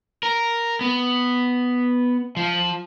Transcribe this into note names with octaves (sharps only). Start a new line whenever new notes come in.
A#4
B3
F3